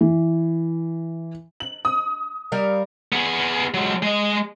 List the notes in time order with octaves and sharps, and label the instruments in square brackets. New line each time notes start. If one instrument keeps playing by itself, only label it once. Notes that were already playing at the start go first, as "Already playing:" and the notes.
[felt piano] E3
[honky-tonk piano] F#7
D#6
[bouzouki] G3 A#4 F5
[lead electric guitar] B3 G#4
F#3 G#3
G#3 D#5